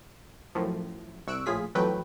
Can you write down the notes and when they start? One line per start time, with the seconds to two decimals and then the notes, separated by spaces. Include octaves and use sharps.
0.55 F#2 A2 F3
1.27 C2 C#6 E6 F#6 D7
1.46 A#1 A2 F4 G#4 B6
1.75 F2 E3 F#3 A3 B4 G5